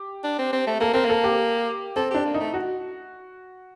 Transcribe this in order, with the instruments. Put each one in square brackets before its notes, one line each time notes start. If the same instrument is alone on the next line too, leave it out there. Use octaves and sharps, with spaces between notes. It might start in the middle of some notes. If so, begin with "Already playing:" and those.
Already playing: [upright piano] G4
[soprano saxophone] D4
C4
C4
A3
[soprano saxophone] A#3 [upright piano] A4
[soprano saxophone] C4 [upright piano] A#4
[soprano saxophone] A#3 [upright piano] A4
[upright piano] G4
[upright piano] C4 [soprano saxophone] A4
[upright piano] D4 [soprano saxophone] G4
[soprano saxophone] A#3
[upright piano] D#4
[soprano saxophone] A3
[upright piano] F#4